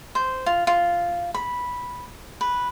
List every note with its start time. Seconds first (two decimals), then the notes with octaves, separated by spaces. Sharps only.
0.15 C5
0.46 F4
0.67 F4
1.34 B5
2.41 B4